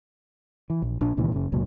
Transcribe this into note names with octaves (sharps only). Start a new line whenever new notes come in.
E3
A#1
A#1 D4
C#2 A#2 D#3 E3
F#1 F#2 C#3
F1 C#2 A#2 F#3